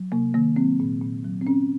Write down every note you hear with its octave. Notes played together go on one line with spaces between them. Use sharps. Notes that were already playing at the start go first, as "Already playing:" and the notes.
Already playing: F#3
C3 A#3
D#3 A#3
F#3 C4
A#2
A#2
F#3
C4
F#3 C#4